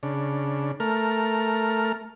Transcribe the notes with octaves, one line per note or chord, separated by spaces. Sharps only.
C#3 D4
A3 A#4 F6